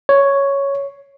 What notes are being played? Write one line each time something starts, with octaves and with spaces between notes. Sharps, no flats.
C#5